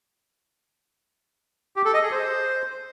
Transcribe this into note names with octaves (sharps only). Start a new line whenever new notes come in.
G4
A4
D#5
G#4
C5